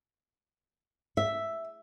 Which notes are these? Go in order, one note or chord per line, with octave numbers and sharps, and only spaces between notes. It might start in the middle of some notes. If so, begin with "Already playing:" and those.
E5